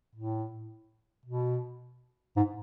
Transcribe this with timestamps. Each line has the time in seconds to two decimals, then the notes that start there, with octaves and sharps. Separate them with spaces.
0.15 A2
1.25 B2
2.36 G#2